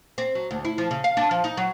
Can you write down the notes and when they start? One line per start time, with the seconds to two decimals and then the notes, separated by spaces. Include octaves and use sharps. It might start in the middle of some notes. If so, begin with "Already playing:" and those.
0.18 C4
0.35 F#3
0.51 D2
0.65 E4
0.78 F3
0.91 C#3
1.04 F5
1.17 D4
1.31 F3
1.44 D#4
1.57 F#3